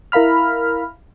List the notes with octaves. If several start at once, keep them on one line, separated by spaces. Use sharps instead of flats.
E4 A#4 F5 B5 F6